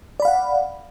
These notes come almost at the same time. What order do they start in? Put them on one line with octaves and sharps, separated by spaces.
D5 B5 F5 F#5